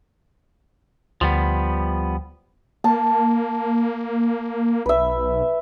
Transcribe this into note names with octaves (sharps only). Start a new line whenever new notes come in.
D2 F3 G3 B3
A#3 A5
B1 B4 E5